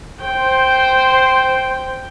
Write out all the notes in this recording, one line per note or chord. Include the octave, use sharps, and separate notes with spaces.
C5 G5